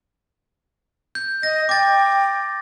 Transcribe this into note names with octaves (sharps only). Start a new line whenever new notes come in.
G6
D#5 A#6
G5 D6 A6